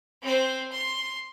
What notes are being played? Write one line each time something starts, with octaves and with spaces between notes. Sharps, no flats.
C4 C5
C6